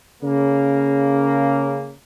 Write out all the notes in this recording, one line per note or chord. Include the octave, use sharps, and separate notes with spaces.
C#3 A#3